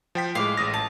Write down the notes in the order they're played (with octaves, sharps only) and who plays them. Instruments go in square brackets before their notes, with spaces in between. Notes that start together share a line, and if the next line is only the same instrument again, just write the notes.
[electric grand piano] F3 G5 B6
[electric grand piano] A2 G#3 [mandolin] F5 D6
[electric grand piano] A1 D#6 A#6
[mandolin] A5